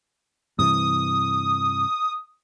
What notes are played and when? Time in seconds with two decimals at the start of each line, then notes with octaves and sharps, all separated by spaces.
0.59 G2 C3 E3 D#6